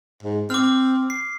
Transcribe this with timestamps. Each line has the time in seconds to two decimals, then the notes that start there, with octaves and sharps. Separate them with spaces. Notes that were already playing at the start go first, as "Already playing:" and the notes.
0.23 G#2
0.50 C4 D6 F6
1.10 C7